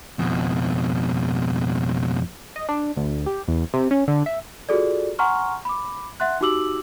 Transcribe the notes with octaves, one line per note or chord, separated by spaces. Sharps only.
F2 B2
D#5
D4
D2
G4
E2
C3
C#4
D3
E5
F4 F#4 G#4 A4 D5
F#5 G#5 A#5 C6 C#6 F6
B5 D6
E5 F#5 C6 F#6
D#4 F#4 G4 D6 E6 F#7